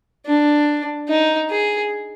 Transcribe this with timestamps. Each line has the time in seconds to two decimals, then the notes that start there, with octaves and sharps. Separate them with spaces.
0.26 D4
1.09 D#4
1.50 G#4